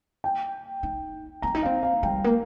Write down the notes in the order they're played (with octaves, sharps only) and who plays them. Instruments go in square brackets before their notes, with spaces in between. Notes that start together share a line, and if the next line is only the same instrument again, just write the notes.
[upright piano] G5
[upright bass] D#4
[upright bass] C4 [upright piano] A#5
[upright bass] D#4
[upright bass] C4 [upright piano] F5
[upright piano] F5
[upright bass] G3 [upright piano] G5
[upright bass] A#3